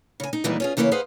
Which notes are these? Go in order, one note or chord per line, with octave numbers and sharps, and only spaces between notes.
C#3 G#5
D#4
D#2 A#2 E3 G3 G#3 B3
C#4 F4 G#4
C#3 E3 A#3 C#5 E5 F5
G#4 B4 C5 D#5 F5 F#5